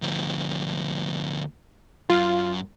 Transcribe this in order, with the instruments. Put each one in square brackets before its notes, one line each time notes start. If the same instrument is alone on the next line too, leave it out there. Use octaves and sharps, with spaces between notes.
[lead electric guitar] D2 F3
[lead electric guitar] F#2 [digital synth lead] F4